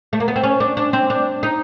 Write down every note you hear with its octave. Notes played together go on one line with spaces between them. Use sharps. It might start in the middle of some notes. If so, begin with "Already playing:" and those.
A3
A#3
B3
C4
C#4
D4
D4
C4
D4
D#4